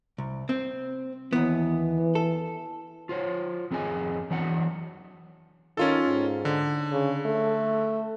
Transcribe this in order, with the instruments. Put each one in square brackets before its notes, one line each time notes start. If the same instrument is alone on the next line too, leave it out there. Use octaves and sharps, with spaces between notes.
[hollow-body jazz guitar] C2
C4
[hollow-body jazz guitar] D#2 B3 [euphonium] E3
[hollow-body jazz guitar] A4
[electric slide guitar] F4 C5 C#5
F2 C4 G#4 D#5 G#5
E3 F#3 D4 E5 F#5
[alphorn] D#3 [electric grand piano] C#4 F4 A4
[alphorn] G#2
[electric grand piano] D3
[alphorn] C#3
A3